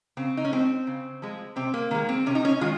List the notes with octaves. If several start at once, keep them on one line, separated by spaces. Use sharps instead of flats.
C#3 C4
D#4
C#4
F3 G#3 C4
C#3
F3 G#3
C3 C4
A#3
D#3 G#3 A#3
C4
C3 C#4
D#4
C#4
D#3 G#3 F4